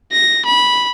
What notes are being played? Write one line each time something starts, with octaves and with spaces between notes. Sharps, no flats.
A#6
B5